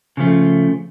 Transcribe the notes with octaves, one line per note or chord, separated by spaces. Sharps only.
C#3 F3 A3